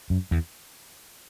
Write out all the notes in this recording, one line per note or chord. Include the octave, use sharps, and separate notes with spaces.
F#2
E2